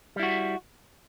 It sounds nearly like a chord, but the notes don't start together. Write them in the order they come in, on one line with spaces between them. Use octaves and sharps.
G3 E4 F#4